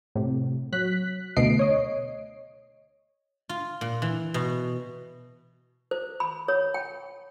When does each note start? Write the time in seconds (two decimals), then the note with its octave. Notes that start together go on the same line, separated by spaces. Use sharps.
0.15 A2 C3
0.73 F#3 F#6 B6
1.36 D2 B2 A3 D#5 C7 D7
1.59 C#5 D#5
3.49 F4
3.81 A#2
4.02 E3
4.34 B2
5.91 C5
6.20 B5
6.48 C#5
6.74 G5